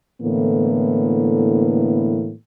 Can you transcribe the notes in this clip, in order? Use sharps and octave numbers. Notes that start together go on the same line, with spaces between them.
A2 D3 E3 A#3 B3